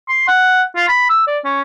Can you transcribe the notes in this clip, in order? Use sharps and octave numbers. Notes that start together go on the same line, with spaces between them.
C6
F#5
F4
B5
E6
D5
C#4